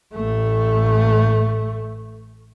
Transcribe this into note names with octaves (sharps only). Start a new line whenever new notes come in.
A1 A3